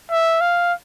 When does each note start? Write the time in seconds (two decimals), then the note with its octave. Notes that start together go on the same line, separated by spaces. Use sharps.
0.11 E5
0.41 F5